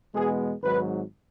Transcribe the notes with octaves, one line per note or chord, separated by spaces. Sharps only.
E2 B2 G#3 B3 G#4
G#1 G#2 F#3 B4